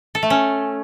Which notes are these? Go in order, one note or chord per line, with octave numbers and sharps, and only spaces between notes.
A4
A3
C#4